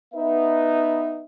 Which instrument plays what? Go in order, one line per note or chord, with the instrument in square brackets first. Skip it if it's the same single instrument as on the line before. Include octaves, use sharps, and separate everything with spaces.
[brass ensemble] B3 D#4 B4 E5